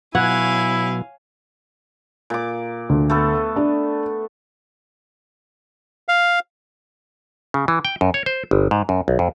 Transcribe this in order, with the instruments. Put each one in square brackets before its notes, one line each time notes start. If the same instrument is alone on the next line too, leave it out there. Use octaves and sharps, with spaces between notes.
[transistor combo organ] B2 F#3 [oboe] E4 [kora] C#5 F#5 [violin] F5 G#5
[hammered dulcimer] A#2 D6
[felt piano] D2
[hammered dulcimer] A3 B3 A4
[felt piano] D4
[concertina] F5
[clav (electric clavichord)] C#3
E3
G5
F#2
C#5
C5
G1
G#2
F#2
B1
F2